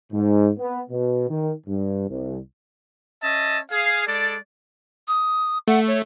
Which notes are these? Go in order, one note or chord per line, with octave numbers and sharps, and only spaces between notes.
G#2
B3
B2
D#3
G2
C2
C#4 D#5 E5 A5
G#4 F5
G#3 A4 D5
D#6
A3 F#5
C#5